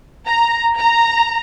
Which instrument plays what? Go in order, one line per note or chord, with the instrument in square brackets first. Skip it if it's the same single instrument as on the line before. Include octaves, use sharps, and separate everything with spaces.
[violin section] A#5
A#5